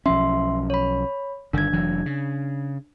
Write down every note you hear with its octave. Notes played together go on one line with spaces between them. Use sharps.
B1 F3 C#4 E5 C6
C#5 B5
G1 D3 D#3 D4 G#6
F1 E3 F#3
C#3